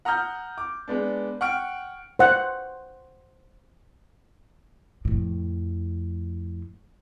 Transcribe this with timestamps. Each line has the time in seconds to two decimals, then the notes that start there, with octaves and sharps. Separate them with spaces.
0.05 F#5 A#5 D#6 F6 G6
0.58 D6
0.88 G#3 B3 D4
1.41 F#5 G5 C#6 F6 D7
2.19 C5 F#5
5.05 F2 A2